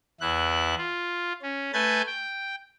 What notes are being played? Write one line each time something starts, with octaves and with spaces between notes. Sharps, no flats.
E2 E4 F#6
F4
C#4
A3 B4 G#5 G6 A6
G5